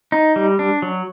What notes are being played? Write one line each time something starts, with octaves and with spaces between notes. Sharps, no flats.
D#4
G3
D4
F#3